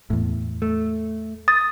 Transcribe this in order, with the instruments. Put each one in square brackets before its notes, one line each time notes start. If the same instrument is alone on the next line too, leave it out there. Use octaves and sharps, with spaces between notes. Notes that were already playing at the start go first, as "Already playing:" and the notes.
[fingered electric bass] E2 A2
[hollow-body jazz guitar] A3
[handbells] D#6 [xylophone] A6